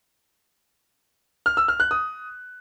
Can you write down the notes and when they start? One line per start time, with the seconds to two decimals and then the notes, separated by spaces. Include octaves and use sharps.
1.46 F6
1.57 E6
1.68 F6
1.80 F#6
1.91 D#6